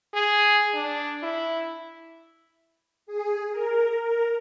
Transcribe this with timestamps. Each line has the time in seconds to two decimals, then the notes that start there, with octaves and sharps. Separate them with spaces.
0.14 G#4
0.74 D4
1.23 E4
3.07 G#4
3.51 A#4
4.00 A#4